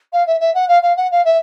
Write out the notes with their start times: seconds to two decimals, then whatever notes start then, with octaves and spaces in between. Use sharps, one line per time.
0.12 F5
0.27 E5
0.40 E5
0.54 F#5
0.68 F5
0.82 F5
0.96 F#5
1.11 F5
1.25 E5